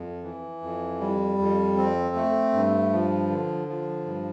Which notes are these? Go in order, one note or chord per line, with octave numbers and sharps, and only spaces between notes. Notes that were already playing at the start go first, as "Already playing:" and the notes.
Already playing: F2
E3
F2
G3
F2
C4
A3
G2
F3
D3
F3
G2